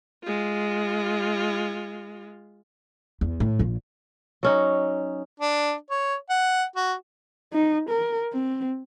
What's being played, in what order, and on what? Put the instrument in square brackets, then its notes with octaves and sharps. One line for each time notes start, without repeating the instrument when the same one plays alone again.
[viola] G#3 F4
[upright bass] E2
A2
A#1 F3
[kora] F#3 C#4 D#4
[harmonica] D4
C#5
F#5
F#4
[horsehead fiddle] D#4
A#4
C4